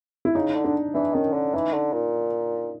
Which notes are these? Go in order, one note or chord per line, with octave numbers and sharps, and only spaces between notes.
E4
C#3 D#4
D3
D4
E3 D4
D#3 C#4
D3
E3 D#4
D3
A#2